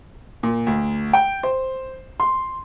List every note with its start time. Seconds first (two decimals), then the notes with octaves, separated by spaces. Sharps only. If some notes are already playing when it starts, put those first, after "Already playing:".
0.43 A#2
0.67 D2
1.13 G5
1.43 C5
2.20 C6